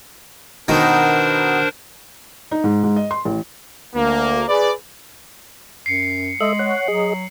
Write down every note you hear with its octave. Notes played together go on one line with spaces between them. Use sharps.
B2 D#3 D4 D#4 A#4 C5
D#4
G#2
G#2
D#5
C6
A1
D2 A#3
G#4 B4 D5
F#2 C7 C#7
G#3 A4 D#5 E5 F#7
C#5 F#5
F#3 G#4 D#5